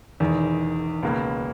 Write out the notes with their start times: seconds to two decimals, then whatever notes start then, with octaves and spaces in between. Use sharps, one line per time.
0.20 E1 E2 D#3
1.03 C#2 B2 A#3